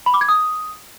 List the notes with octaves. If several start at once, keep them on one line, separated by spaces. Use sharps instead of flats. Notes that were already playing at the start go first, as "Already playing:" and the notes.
B5
D6
G#6
D#6